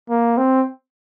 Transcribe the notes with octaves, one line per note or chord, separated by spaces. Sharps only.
A#3
C4